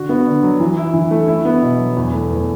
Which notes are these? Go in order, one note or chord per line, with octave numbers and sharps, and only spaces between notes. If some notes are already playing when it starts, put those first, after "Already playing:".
Already playing: D3 F#4
B3
D3
F#3
E3
E4
E3
A3
E4
B3
B2
F#3
E2
A3
E2